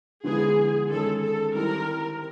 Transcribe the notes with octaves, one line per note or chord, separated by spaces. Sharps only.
D3 F3 G#3 B3 E4 G#4
D#3 G#3 C#4 A4
A4
D#3 G3 C4 E4 G4 A#4